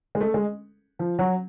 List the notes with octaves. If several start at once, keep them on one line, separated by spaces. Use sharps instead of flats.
G#3
A3
G#3
F3
F#3